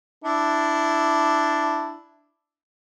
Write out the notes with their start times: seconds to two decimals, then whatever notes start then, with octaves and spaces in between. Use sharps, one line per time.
0.24 D4 E4